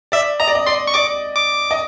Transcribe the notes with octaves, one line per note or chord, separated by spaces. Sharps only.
D5 E5
D#5 A#5
D5
D#5
D5 C6
C#6
D5 D6
D6
D#5